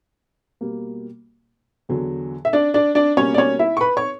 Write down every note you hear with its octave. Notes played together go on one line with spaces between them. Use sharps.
B2 G3 A#3
E2 D3 F#3
E5
D4 D5
D4 D5
D4 D5
B2 G3 A#3 C#4 C#5
D5
C#4 C#5
E4 E5
C#6
B4 B5
C#5 C#6